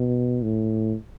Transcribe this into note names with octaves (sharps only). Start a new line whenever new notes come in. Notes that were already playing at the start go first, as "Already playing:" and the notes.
Already playing: B2
A2